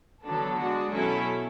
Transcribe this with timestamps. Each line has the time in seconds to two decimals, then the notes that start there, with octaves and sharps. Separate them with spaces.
0.24 D3 F#3 B3 D4 A4
0.58 G#3 D4 F#4
0.91 B2 F#3 C#4 E4 A4